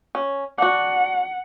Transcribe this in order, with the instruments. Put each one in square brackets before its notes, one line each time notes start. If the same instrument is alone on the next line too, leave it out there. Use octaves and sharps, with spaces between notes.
[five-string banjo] C#4
[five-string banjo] D4 F#4 [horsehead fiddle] F#5